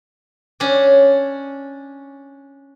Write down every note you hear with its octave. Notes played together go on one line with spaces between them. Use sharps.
C#4 D4